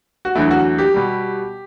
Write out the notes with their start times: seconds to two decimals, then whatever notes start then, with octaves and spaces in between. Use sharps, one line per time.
0.25 F#4
0.35 E2 D3 F#3 A3 E4
0.51 F#4
0.78 G4
0.94 B2 G3